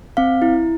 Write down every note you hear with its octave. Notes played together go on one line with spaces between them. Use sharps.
C4 F5
E4